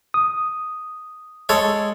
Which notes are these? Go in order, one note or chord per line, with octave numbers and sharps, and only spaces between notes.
D#6
G#3 A4 C#5